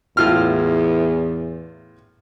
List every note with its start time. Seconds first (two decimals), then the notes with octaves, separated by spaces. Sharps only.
0.17 E2 A2 F4 F6